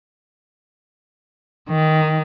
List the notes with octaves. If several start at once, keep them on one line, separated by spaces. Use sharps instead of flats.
D#3